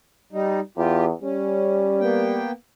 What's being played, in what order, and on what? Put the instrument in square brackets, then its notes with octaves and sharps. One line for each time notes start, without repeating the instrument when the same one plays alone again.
[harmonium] G3 D#4
[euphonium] E2 [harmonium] F4 G4
[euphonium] G3 [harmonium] C#4
[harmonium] A#3 B3 G5